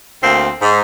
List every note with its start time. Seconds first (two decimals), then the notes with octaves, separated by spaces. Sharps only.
0.23 D2 A#3 C4
0.62 G#2